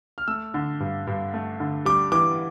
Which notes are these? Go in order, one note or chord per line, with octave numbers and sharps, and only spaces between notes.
F6
A3 E6
D3
G2
G2
A3
D3
G3 D6
E3 D6